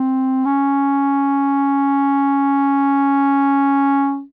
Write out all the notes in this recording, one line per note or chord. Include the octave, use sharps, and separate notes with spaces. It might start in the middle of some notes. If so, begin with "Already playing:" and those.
Already playing: C4
C#4